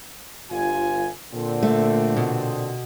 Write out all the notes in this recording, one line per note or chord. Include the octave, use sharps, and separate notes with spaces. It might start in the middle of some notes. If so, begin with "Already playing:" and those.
G1 F4 G#5
A#2 D3 C4
A3
B2